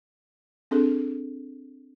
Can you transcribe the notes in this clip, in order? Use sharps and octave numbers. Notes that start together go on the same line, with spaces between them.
C4 D4 G#4 A4